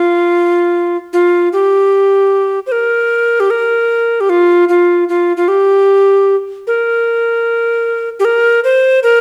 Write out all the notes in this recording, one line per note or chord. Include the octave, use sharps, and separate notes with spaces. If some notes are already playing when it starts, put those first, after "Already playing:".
Already playing: F4
F4
G4
C5
A#4
G4
A#4
G4
F4
F4
F4
F4
G4
A#4
G4
A#4
C5
A#4